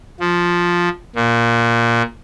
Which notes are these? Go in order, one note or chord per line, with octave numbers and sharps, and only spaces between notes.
F3
A#2